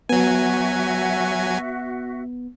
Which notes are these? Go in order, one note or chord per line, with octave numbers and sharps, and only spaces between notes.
F#3 B3 F#4 E5 G#5